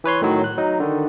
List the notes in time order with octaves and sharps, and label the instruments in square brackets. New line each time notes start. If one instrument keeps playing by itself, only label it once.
[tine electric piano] E3 B4 C#5 C6
A2 D#3 F#3
F#6
F#3 D#4
D3 D#3